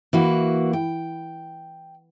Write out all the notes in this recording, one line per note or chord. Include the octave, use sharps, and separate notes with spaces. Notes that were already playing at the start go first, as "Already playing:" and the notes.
E3 A#3 F#4
G5